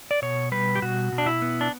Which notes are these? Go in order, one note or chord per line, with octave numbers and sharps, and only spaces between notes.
D5
B2 C#5
G3 B4
G4
B2 F#4
B2
D4
E4
B3
D4